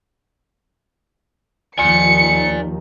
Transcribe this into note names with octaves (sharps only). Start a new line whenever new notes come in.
D#2 D#3 F3 D5 G#5 C#7